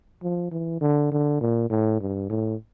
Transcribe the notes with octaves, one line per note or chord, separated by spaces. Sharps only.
F3
E3
D3
D3
A#2
A2
G2
A2